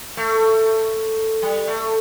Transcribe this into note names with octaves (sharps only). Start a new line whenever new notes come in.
A3
G3
A3